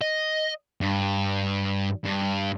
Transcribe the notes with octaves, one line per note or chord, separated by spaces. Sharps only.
D#5
G2
G2